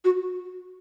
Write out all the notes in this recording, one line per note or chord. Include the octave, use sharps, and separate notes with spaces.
F#4